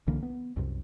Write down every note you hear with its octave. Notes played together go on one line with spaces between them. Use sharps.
C2 D3 E3 A#3
B3
C2 F#2 C3